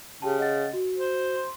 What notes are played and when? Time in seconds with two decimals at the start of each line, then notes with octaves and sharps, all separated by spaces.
0.22 C#3 G4 G5 A5
0.39 D#5 F#5 A6
0.73 F#4
0.97 C5
1.36 C6